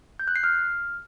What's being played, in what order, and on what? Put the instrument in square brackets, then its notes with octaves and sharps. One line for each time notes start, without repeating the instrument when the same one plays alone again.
[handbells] G6
F#6
C7
F6